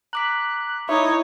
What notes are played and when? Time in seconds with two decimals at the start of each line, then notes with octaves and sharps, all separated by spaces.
0.13 A#5 D6 F#6 B6
0.89 D#4 E4 C#5